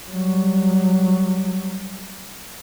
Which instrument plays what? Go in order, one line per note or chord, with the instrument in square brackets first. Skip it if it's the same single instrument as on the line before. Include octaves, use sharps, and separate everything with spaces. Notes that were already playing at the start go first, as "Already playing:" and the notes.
[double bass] F#3 G3